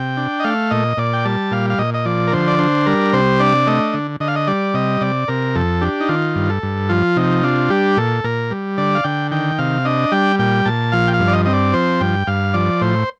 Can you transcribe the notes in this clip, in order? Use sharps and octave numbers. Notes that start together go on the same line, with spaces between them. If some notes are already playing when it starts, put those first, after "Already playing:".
Already playing: C3 G5
D4
D#5
A3 F5
A#2 D#5
A#2 D5
G5
G3 A5
A#2 F5
F5
A#2 D#5
D#5
F3 D5
A#4
D3 C5
D5
D4 C5
G3 A#4
C3 C5
D4 D5
A3 D#5
D3
D3 D#5
F5
D#5
G3 D5
C3 D#5
C3 D5
C3 A#4
F2 A4
D4 G4
D#4
D#3 F4
G2
A4
G2
F3 F4
C3 D#4
D4 F4
G3 G4
A#2 A4
A#2 A#4
G3
D3 D5
F5
D3 G5
D#3 G5
C3 F5
D4 D#5
G3 G5
A#2 G5
A#2 A5
F3 F5
G5
F5
G2
D5
D#5
C4 D#5
D5
F3 C5
G2 G5
G2 F5
F3 D5
A2 C5